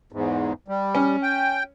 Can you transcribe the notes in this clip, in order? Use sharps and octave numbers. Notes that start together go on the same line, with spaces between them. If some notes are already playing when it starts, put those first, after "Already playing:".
E2 G#2
G3
C#4
G5